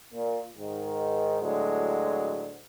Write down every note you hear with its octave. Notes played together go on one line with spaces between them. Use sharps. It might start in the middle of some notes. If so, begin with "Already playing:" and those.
A#2
G#2 D#3
D2 A2 F#3 G#3